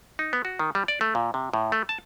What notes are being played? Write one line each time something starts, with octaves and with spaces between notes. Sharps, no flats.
D#4
B3
F#4
D#3
G3
D5
A3
A#2
C3
A2
A3
A5